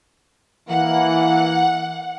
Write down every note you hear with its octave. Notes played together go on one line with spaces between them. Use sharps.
E3 A#3 F#5